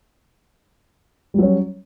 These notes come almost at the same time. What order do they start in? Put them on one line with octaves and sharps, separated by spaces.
G3 F#3 C#4